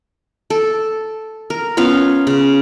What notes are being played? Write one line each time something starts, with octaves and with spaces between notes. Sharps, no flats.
A4
A#4
B3 C#4 F4 F5
C#3